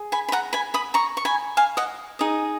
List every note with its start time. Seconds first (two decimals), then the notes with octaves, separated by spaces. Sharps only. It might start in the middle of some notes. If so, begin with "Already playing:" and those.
Already playing: G#4
0.12 G#5 B5
0.29 B5
0.32 F#5 A#5
0.53 G#5 B5
0.74 B5 D#6
0.94 A#5 C#6
1.17 C#6
1.25 G#5 B5
1.57 F5 G#5
1.77 D#5 F#5
2.19 D#4 G#4 D#5